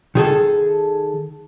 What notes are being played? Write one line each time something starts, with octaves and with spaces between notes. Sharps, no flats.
D#3 G#4 A4